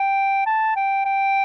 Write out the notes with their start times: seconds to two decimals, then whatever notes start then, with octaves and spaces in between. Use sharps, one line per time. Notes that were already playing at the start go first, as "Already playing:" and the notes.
Already playing: G5
0.46 A5
0.76 G5
1.06 G5